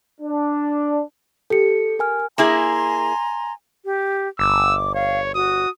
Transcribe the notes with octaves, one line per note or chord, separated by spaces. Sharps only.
D4
G4 A4 C#7
A#4 G#5 F6
A#3 E4 G#4 G#5 A#5 C6
G4
G1 D6 E6
C#5 F5
F#4 D#6